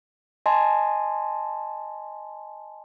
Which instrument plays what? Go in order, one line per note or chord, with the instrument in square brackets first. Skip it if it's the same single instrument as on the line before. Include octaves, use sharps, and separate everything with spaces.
[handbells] D#5 G#5 A5 C6